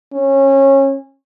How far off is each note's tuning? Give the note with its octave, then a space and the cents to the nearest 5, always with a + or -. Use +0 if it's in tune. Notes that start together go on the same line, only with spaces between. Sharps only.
C#4 -25